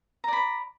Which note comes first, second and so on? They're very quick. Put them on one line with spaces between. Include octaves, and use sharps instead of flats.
A#5 D5 B5